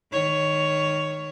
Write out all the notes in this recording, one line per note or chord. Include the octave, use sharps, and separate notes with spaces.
D#3 C#5